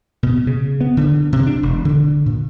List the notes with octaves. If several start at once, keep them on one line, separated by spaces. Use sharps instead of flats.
B2
C#3
B3
D3
C3
D4
E1
D3
A#2